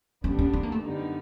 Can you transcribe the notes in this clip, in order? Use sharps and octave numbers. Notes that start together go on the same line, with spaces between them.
G2 D3 G3 B3 C#4 D4
C#4
C4
A#3
A3
F#2 D3 G3 B3 D#4